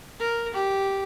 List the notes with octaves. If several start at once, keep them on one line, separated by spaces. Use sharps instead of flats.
A#4
G4